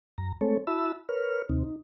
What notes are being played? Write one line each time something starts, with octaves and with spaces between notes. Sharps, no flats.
F#2 A#5
G#3 A3 C4 A4 C#5
E4 F#4 E5 A5 B5 E6
A#4 B4 C#5 F6
D#2 C3 C4 D#4
D#4